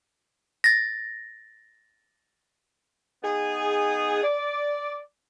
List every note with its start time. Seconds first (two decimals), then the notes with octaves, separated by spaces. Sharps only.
0.64 A6 A#6
3.24 B3 D#4 G#4
4.23 D5